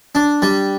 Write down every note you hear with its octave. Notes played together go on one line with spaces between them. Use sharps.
D4
G3